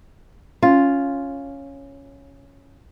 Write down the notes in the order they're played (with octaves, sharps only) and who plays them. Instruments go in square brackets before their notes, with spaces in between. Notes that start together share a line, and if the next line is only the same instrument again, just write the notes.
[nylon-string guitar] C#4 [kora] F4